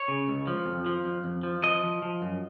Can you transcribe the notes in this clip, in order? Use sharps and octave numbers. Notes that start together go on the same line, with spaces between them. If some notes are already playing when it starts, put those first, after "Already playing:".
Already playing: C#5
C#3
C#2
F3
F2
F3
F2
F2
F3
F3 D#5
F3
F3
F#2